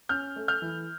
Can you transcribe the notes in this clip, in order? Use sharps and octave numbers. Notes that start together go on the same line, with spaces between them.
C#4 F6 G6
A3
F6 G6
E3